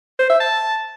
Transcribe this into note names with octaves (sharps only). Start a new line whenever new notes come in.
C5
E5
A5